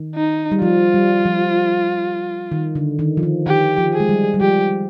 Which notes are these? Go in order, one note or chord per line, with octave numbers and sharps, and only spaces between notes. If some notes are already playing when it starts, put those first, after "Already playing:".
Already playing: D#3
D#4
G3
F3 F4
G3
F3
D#3
D3
D#3
F3
D#3
D#3 G4
F3
G#4
G#3
G3
G3
F3 G4